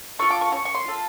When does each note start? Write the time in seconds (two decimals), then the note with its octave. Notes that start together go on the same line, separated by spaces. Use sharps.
0.19 F4 A4 C#6
0.31 D6
0.41 C#6
0.52 C#4 C#6
0.65 C#6
0.75 C6
0.85 F4 A4